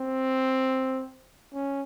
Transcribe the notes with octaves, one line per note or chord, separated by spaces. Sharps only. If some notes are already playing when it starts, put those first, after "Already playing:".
Already playing: C4
C#4